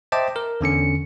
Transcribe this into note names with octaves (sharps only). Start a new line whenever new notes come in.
C5 D#5 E5 G5 A5 D6
A#4
E2 D3 C#4 C#7